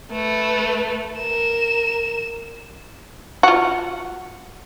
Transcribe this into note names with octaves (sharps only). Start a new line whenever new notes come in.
A3 B4
A#4 E7
F4 F#4